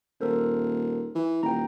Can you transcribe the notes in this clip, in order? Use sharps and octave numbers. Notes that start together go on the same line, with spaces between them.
D#1 A4 A#4 C5
E3
D#1 G5 A#5